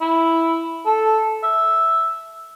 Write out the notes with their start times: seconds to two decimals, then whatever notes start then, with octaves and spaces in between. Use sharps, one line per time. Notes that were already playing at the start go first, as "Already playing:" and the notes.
0.01 E4
0.86 A4
1.43 E5